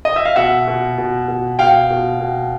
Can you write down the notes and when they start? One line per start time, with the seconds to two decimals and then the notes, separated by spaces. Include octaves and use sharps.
0.05 D#5
0.16 E5
0.25 F5
0.36 B2 E5 F#5
0.68 B2
0.98 B2
1.28 B2
1.59 B2 F5 G5
1.90 B2
2.20 B2